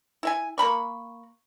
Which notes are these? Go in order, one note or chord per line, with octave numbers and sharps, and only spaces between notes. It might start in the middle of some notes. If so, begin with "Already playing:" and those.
E4 E5 G#5
A#3 A#5 B5 C#6